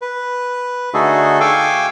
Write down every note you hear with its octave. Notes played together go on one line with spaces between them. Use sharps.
B4
D3 A3 D#4 F#4 G#4 A4
F5 G5 G#5 C#6 D6 E6